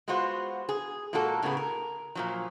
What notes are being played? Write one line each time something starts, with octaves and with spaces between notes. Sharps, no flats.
G#3 B3 F4 F#4 C5
G#4
A#2 G#3 A#3 F#4 A4
A2 C#3 A#3 B3 G#4
A#4
A#2 F3 F#3